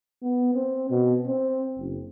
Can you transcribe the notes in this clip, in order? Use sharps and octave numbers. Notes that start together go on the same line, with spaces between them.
B3
C4
B2
C4
F#1